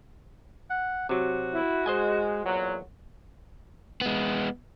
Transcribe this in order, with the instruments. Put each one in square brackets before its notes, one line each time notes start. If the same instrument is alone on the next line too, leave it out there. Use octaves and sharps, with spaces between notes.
[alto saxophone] F#5
[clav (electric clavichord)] C3 F#3 [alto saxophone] F#4
[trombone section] E4
[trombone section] G#3 [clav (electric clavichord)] C5 D#5 G#5
[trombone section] E2 A#2 F#3
[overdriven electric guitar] G#3 B3